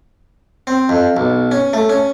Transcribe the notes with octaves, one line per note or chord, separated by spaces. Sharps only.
C4
F2
B1
C#4
A3
C#4